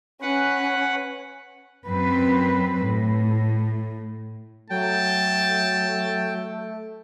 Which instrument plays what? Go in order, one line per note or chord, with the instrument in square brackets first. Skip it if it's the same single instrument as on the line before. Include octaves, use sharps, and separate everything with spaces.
[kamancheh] C#4 [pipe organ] B4 F#5
[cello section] F#2 C4 B4
A2
[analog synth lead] F#3 [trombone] A3 [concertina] G5 [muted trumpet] A5